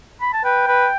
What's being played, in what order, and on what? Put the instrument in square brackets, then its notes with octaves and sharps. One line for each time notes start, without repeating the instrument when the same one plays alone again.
[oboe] B5
A5
[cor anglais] B4 [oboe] G5
[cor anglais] B4